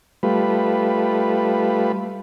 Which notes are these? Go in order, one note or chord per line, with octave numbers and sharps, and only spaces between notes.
G3 A3 F4 B4